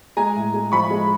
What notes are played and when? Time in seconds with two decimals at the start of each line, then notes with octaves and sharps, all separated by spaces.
0.17 G#3 G#5 A#5
0.35 A2
0.54 G#3
0.72 F3 B5 C#6
0.90 G#3